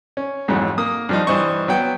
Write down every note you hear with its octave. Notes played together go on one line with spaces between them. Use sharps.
C#4
F2 G#2 E3 F#3
A#3 D#6
G2 F3 D#4
G2 E3 C5 D#5 C#6
F#3 B3 G5